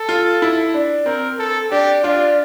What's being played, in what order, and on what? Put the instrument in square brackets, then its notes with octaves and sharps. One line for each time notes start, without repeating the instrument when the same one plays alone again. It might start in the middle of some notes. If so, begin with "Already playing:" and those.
Already playing: [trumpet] A4
[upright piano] F4
E4
D4
[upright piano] C4 [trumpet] A#4
[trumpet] A4
[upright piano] D4 [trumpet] G4
[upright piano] D4 [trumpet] F4